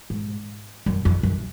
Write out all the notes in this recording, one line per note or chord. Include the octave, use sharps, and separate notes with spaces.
G#2
F#2
F2
F#2